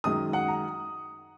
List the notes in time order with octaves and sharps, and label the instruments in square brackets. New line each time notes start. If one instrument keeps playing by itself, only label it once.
[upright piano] F#2 D#3 G#3 D#6
F#5
A#5